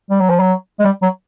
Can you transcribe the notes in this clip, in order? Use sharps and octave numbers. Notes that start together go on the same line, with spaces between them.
G3
F#3
F3
F#3
G#3
G3
F#3